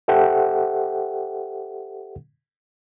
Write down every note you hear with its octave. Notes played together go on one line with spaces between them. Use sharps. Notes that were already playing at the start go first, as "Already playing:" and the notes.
G4 A4 C5 E5 F#5 G5